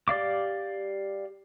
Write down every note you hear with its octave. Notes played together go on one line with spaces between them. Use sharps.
G4 D5 F5 D6